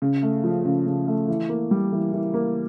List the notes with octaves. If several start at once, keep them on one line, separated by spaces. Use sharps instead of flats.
C#3
A3
F3
C#3
C#3
A3
E3
A#3
G3
E3
E3
A#3